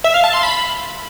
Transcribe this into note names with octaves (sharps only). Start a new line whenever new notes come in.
E5
F5
A5
C6
B5